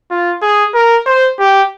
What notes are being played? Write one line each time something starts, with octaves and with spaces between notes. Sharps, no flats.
F4
G#4
A#4
C5
G4